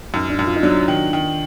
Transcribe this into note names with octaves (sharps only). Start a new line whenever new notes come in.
F#2 D#4
D4
F#2
F4
D#4
F#3 D4
D#3
D#3